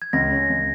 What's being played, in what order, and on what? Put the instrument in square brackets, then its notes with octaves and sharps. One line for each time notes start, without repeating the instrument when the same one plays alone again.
[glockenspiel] G#6
[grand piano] C#2 [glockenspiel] A#6
[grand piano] C#4
C#2